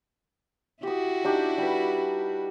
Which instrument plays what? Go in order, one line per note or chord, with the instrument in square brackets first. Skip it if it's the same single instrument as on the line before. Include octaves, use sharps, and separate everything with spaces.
[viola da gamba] E4 F#4 [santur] G4 D#6
[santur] D4 D#4 G4
G3 B4